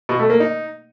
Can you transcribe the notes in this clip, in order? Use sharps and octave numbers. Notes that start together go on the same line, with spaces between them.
B2
A3
A#3
D#4